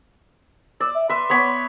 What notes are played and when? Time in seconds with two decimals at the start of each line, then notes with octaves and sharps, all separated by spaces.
0.80 D5 E6
0.95 E5
1.09 B4 E5 C6
1.30 B3 C#5 B5